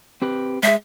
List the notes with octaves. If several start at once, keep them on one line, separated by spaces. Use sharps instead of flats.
C4 G4 B4
G#3 G#4 E5